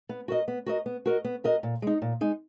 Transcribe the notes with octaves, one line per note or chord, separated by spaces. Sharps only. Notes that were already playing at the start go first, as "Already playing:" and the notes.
B3
F#4 A#4 D#5
B3
F#4 A#4 D#5
B3
F#4 A#4 D#5
B3
F#4 A#4 D#5
A#2
G#3 D#4
A#2
G#3 D#4